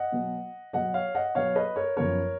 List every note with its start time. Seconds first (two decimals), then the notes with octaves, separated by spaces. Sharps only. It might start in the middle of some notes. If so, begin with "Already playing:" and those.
Already playing: D#5 F#5
0.12 B2 F#3 B3
0.73 B2 F#3 B3 D#5 F#5
0.94 C#5 F5
1.15 D#5 F#5
1.35 B2 F#3 B3 C#5 F5
1.56 B4 D#5
1.76 A#4 C#5
1.97 F#2 F3 B3 A#4 C#5